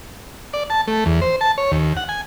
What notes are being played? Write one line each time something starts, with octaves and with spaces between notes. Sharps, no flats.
D5
A5
A3
E2
C5
A5
C#5
D#2
F#5
G#5